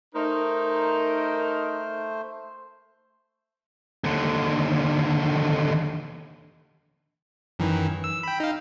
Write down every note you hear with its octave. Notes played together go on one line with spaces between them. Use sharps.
A3 D#4 A#4 C5
D#2 D3
F#2 D#3 E3
E6
G5 B5
D#4 F5